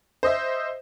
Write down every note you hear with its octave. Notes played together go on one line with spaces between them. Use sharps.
C5 D#5 E5